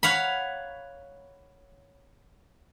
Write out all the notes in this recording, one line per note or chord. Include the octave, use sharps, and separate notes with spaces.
C#5 F5 F#5 B5